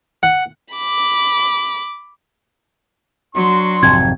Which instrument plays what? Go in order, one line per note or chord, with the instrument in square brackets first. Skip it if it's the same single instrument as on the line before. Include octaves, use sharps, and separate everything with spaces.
[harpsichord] F#5
[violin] B5 D6
[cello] F#3 [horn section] D4 F#4 C6
[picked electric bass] G#1 F2 C3 [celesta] G#6